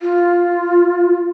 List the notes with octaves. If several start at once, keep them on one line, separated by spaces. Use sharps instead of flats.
F4